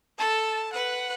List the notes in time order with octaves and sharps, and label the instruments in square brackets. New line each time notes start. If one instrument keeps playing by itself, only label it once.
[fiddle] A4 [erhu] A5
[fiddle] B4 [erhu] F#5